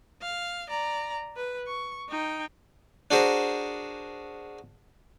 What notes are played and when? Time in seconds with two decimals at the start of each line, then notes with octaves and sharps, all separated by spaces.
0.22 F5
0.69 D5 A#5
1.36 B4
1.66 C#6
2.09 D#4 G5
3.11 D4 F#4 G#4 A#4 C5